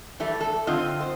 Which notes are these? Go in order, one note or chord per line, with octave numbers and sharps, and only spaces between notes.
E3 G3 A3
A4
D3 C4 F4 D#5
C5